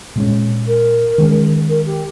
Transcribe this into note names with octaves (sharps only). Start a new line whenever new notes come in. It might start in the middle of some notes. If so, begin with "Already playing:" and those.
A#2 G#3 C#4
A#4
D#3 G#3 C#4
A#4
G4